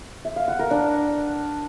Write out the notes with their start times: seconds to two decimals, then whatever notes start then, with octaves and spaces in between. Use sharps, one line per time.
0.25 E5
0.36 F5
0.48 F#5
0.59 A#4
0.71 D4